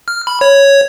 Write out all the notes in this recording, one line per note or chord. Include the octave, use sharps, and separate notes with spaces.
F6
B5
C#5